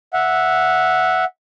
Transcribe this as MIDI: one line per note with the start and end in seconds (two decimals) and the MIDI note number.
0.13 1.24 76
0.13 1.24 78